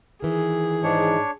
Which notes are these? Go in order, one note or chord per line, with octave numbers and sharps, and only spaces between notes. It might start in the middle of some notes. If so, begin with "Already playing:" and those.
D#3 E3 G#4
G#2 D4 C#5